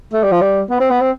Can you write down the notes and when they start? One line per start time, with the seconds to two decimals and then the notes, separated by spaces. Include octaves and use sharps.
0.13 A3
0.23 G3
0.32 F3
0.41 G3
0.70 B3
0.80 C4
0.91 B3
1.01 C4